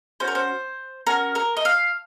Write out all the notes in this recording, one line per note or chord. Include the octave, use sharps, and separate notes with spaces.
C#4 F#4 C5
A#4
C5
C#4 F#4 A#4
A#4
D#5
F5